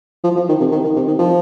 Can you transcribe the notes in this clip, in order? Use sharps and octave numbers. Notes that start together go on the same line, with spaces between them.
F3
F3
D#3
C3
D#3
D#3
C3
D#3
F3